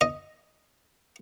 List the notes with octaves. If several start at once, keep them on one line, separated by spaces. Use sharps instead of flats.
D#5